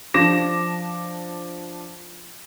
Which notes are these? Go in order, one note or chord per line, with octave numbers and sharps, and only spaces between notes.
F3 D4 D6 A#6 E7